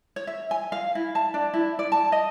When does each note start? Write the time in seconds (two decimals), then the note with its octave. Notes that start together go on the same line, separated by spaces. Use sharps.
0.16 C#5
0.27 E5
0.51 G#5
0.72 F5
0.95 E4
1.15 A5
1.34 D4
1.54 E4
1.79 D5
1.92 A5
2.12 D#5